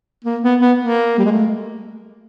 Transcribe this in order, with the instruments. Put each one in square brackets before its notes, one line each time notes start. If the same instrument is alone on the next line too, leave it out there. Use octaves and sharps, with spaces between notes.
[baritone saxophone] A#3
B3
B3
A#3
G3
G#3
A3